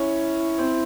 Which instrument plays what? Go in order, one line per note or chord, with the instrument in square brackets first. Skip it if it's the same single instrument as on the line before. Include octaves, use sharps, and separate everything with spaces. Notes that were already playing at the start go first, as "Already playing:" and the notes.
Already playing: [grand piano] C#4 [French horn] E4
[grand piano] C4